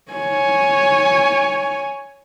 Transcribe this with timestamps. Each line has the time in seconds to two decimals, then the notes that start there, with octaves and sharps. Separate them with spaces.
0.12 C#5 G#5